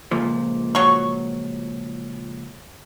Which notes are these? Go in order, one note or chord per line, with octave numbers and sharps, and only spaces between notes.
C#2 A#2 F3
F#3 C#6